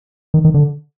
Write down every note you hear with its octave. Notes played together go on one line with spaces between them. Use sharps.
D#3
D#3
D3